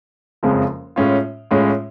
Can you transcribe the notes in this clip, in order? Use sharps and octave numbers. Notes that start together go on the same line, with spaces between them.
F#1 F2 C#3 F3 G#3
A2 G#3 C#4 F4
A2 G#3 C#4 F4